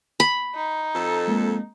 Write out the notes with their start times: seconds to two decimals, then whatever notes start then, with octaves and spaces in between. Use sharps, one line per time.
0.20 B5
0.55 D#4
0.95 F2 A4
1.28 G#3 A#3 C4